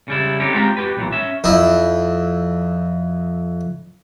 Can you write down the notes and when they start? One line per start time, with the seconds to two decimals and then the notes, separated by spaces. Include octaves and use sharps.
0.08 C#3 G3 E4
0.40 D3 C4 C#4 D#4 G4
0.54 G#3 C4 E4 F4 G4 A#5
0.77 F#4 G4 B4
0.97 B1 A#2 E3
1.12 C#4 E5
1.44 F2 E4